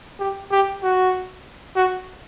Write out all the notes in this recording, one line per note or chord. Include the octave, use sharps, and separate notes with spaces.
G4
G4
F#4
F#4